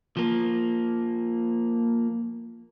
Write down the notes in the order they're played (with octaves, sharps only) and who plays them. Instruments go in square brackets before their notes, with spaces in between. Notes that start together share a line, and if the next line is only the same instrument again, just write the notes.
[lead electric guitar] F3 A#3